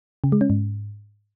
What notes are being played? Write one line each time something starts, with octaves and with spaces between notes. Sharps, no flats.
C#3
G#3
C#4
G#2